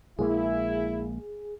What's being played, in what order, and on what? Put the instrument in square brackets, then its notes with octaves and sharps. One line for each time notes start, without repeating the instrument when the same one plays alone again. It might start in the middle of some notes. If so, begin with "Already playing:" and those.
[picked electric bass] A#1 G#3 A#3 [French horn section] E4 [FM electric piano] G#4